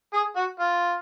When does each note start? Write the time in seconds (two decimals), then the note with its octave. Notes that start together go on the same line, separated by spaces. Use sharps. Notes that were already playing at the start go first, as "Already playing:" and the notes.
0.13 G#4
0.36 F#4
0.59 F4